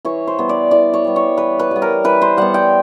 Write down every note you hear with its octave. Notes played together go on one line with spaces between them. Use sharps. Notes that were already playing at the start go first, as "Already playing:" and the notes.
E3 C#5
C5
G3 B3
D5
E3 D5
C#5
G3 B3
C#5
E3 B4
B4
G3 B3
A#4
E3 B4
C5
G3 B3 F#5
G5